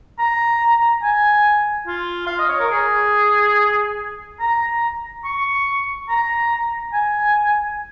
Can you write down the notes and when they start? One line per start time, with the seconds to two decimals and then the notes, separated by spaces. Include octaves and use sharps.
0.19 A#5
1.02 G#5
1.87 F4
2.27 F5
2.38 D#5
2.49 C#5
2.60 A#4
2.71 G#4
4.40 A#5
5.24 C#6
6.08 A#5
6.93 G#5